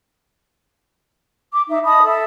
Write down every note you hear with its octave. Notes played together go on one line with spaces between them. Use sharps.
D6
D#4 E5
D#5 A5 B5 D#6
A4 E5